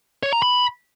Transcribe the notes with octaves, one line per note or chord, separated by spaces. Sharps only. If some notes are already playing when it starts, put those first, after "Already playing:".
C#5
A#5
B5